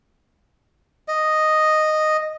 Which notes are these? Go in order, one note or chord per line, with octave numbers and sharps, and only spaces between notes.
D#5